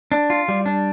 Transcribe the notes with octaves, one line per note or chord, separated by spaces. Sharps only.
D4
F4
G3
D4